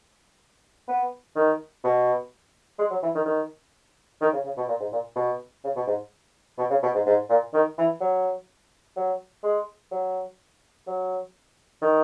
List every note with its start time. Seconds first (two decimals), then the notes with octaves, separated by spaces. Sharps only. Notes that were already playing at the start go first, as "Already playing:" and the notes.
0.88 B3
1.36 D#3
1.84 B2
2.79 G#3
2.90 F#3
3.03 E3
3.15 D#3
3.25 D#3
4.21 D#3
4.33 C#3
4.44 C#3
4.57 B2
4.68 A#2
4.80 G#2
4.92 A#2
5.16 B2
5.64 C#3
5.76 B2
5.87 G#2
6.58 B2
6.70 C#3
6.83 B2
6.94 G#2
7.06 G#2
7.30 A#2
7.54 D#3
7.78 E3
8.01 F#3
8.96 F#3
9.43 G#3
9.91 F#3
10.87 F#3
11.82 D#3